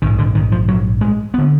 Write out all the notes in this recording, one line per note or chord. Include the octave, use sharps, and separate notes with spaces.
A#1 G#2 D#3
D3
D#3
F3
F#3
G#3
D3 B3